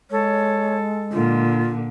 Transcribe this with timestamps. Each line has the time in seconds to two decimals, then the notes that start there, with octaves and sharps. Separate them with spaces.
0.11 G#3 A4 C#5
1.12 A#2 D3 F4